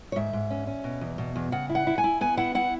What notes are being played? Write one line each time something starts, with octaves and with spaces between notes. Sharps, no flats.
C#5
G#2 E5
G#2
C#4
C#4
B2
E2
B2
E2
C#3 F#5
E4
F#5
E4
G#5
E4
B3 G#5
E4 F#5
E4 F#5